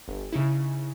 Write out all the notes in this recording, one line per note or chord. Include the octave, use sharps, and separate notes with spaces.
G1
C#3 D#4 E4